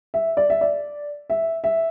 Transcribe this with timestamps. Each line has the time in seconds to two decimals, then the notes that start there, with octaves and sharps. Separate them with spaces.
0.14 E5
0.37 D5
0.50 E5
0.61 D5
1.30 E5
1.64 E5